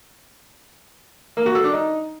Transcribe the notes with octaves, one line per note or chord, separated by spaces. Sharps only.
A#3
F#4
A4
D4
D#4